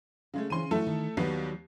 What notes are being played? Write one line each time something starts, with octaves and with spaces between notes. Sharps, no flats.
C#3 G#3 A3 F5
C#3 E3 C4 C#4 C6 D#7
F#3 A3 C#4 E4 F#4 A4
D#3
D#2 D#3 F#3 G3 B3 C7